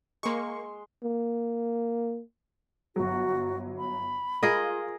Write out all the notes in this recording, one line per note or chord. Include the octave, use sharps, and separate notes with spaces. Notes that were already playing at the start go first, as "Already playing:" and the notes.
G#3 A#3 C6 C#6
A#3
G1 F#3 F#4
B5
F4 G#4 A#4 D#5